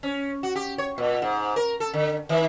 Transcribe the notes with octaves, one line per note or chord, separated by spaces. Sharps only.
C#4
F#4
G4
C#5
A#2
G#2
A#4
A4
D3
D#3